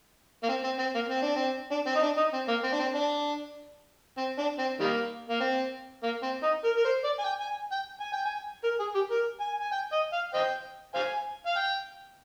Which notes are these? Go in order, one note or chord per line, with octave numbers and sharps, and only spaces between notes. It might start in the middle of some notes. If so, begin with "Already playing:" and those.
A#3
C4
C4
C4
A#3
C4
D4
C4
D4
C4
D#4
D4
D#4
C4
A#3
C4
D4
C4
D4
C4
D4
C4
D#3 G3 A#3
A#3
C4
A#3
C4
D#4
A#4
A#4
C5
D5
G#5
G5
G#5
G5
G#5
G5
G#5
A#4
G#4
G4
A#4
G#5
G#5
G5
D#5
F5
C5 D#5 G5
C5 F5 G#5
F5
G5